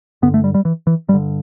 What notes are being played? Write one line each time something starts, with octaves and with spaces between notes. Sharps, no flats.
G2 D3 B3
A3
G3
G3
E3
E3
G2 G3
D3